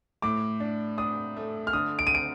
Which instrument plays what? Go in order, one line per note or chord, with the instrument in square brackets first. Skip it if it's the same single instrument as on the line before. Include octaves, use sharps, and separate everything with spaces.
[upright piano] A2 [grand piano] D6
[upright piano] D4
[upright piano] D4 [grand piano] D#6
[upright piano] A3
[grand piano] F6
[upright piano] D3 [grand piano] D#6
[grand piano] D7
D#7
D7